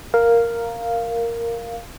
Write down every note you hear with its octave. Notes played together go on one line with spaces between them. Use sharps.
A#4 F5